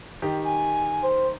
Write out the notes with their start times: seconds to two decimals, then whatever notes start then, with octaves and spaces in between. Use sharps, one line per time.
0.22 D#3 G4
0.45 G#5
1.03 C5